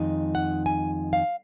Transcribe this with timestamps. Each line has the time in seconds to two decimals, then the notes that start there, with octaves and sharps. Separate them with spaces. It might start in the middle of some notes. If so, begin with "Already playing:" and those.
Already playing: F2 D#3 G#3 D#4
0.35 F#5
0.66 G#5
1.13 F5